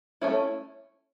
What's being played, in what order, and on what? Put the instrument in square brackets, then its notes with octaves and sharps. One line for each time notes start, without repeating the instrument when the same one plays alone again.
[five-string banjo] A3 C#4 E4